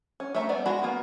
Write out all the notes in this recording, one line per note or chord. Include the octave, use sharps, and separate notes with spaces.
C#4
A3 E5 A#5
G3 B3 D5
G#3 F#4 B5
A#3 B3 F4